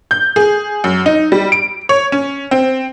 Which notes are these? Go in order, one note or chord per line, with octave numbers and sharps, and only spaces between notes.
G6
G#4
F#2
D#4
G3
D7
C#5
C#4
C4